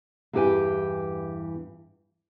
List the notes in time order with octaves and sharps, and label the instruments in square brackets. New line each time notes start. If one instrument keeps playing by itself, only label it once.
[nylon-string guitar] E2 G2 E3 G4 B4 G#5